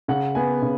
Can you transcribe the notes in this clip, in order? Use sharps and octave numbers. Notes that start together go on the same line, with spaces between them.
C#3 F#5
B3 G#5
C#3